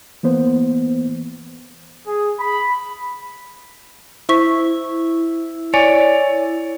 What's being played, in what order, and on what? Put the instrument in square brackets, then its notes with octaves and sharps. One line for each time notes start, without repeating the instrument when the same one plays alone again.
[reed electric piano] E3 A#3 B3 C5
[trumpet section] G#4
B5
[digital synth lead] E4 [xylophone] C5 C#6 B6
[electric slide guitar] C#5 D5 [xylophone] G#5